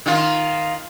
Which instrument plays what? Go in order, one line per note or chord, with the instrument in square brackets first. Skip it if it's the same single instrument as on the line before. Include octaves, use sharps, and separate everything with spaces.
[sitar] D#3 F4